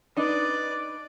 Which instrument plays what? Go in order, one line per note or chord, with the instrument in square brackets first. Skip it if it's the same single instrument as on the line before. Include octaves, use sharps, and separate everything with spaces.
[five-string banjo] D4 D#4 [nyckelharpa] B4 D5